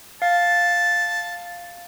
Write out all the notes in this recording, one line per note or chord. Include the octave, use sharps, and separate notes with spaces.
F5 A5